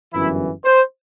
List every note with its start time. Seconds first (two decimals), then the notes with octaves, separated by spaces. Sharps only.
0.13 G1 F#2 E3 E4
0.65 C5